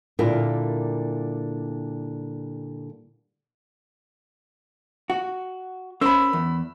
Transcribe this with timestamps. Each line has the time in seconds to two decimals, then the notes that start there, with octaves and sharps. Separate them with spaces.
0.19 A#2 D3 G3 E4 F4 A#4
5.10 F#4
6.01 C#4 A#4 C5 B5 E6
6.33 E2